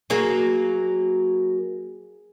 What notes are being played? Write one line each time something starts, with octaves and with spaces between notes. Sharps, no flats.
F#3 A#3 F#4 G#4